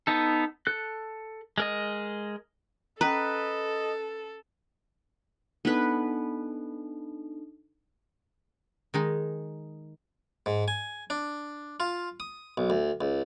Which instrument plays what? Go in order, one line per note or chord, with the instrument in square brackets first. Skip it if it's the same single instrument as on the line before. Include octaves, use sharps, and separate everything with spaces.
[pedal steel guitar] B3 D#4 A4
A4 F#6
G#3 A#4 D#5
[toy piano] C#4 A#5 [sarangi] A4 [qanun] B4 [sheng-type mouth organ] D#5
[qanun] B3 B4 [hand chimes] D4 D#4 A4
[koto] D#3 G#3 D#4
[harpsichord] G#2
G#5
D4
F4
D#6
B1
D2
C#2